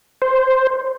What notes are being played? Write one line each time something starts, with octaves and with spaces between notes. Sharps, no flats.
C5